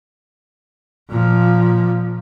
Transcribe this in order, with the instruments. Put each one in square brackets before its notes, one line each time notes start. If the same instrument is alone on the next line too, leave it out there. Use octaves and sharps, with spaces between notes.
[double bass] A#2 F3